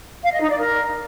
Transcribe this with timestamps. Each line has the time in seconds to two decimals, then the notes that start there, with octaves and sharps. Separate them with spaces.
0.22 F5
0.31 D#5
0.40 D#4
0.50 D5
0.59 A#4